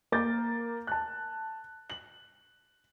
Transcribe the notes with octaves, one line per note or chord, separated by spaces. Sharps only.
A#3 A#4 D6 G6 A6
A5 F#6
F#7